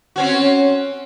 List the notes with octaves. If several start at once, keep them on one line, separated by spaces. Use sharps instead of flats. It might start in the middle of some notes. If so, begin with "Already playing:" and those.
C4 C#4 F#4